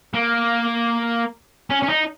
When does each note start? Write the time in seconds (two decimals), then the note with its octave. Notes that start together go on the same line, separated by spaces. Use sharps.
0.14 A#3
1.70 C#4
1.83 C#4
1.89 D#4